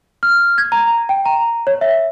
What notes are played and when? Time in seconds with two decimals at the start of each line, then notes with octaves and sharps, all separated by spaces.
0.23 F6
0.58 G#6
0.72 A#5
1.09 G5
1.26 A#5
1.67 C#5
1.81 E5